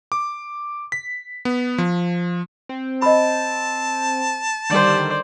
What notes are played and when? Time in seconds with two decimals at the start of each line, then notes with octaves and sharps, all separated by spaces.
0.12 D6
0.92 B6
1.45 B3
1.78 F3
2.69 C4
3.02 D#5 A5 B5
4.70 D3 D#3 G3 C5 D5